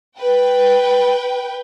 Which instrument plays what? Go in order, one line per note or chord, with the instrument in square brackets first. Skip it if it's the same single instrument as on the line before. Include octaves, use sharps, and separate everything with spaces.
[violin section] B4 G5